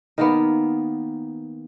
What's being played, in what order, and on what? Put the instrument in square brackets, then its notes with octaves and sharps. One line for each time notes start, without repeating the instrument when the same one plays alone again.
[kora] D#3 A#3 B3